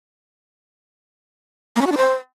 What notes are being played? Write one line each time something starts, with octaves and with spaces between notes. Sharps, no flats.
A#3
C#4
F#4
D4
C5